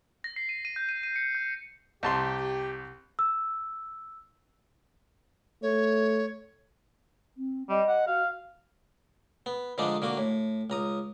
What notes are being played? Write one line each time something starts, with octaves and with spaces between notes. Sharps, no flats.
A#6
C7
D#7
D#7
G6
D#7
D#7
C#7
G6
C2 G4 A5 C6
E6
A3 C#5
C4
G3 D#5
F#5
F#4 F5
B3
D3 F3 G#3 D4 D#4
D3 A#3 F#4
A2
C#2 A#5 D#6